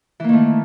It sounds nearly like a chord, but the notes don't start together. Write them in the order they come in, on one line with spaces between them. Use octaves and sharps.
E3 A#3 D#3 A3